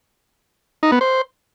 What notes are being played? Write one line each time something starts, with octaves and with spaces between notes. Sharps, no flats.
D#4
B3
C5